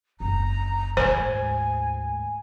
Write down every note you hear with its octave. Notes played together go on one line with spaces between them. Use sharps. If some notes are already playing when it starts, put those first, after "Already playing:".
F#1 D3 A#5
D2 G#2 C5 G#5